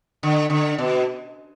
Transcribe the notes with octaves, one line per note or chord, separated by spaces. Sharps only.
D3
D3
B2